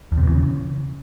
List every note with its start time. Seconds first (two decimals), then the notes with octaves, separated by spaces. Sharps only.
0.12 E2
0.17 C3
0.23 B2
0.29 E3
0.34 C#3